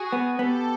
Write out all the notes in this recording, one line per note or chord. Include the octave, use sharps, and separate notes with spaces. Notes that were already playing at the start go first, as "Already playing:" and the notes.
Already playing: F#4 G#4
B3
B3 G4 A4